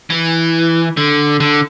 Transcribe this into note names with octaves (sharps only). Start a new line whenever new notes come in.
E3
D3
D3